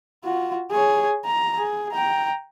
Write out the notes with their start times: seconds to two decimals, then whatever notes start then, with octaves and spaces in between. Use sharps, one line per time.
0.25 F4 F#4
0.71 G#4 C#5
1.25 A#5
1.58 G#4
1.93 G5 A#5